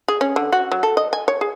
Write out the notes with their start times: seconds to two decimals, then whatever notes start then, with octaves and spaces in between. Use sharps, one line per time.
0.08 G#4
0.21 C#4
0.36 D3
0.52 F#4
0.72 F#3
0.83 A4
0.97 D#5
1.13 G#5
1.28 C#5
1.41 G#4